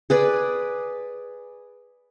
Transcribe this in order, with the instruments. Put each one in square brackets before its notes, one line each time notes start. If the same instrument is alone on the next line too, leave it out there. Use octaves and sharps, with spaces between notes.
[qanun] G#4 B4 D5